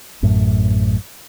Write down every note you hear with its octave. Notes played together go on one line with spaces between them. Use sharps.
A1 F#2 A2